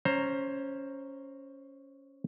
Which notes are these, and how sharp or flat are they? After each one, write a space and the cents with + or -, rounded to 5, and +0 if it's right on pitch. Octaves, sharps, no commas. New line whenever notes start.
C#4 +0 C5 +15 A#5 +0